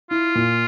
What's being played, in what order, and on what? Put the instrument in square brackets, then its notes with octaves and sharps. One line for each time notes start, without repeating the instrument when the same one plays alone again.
[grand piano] E4 [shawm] F4
[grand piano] A#2